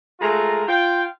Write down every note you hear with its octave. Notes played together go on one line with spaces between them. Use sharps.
G#3 A3 F4 A#4 A#5
F4 G5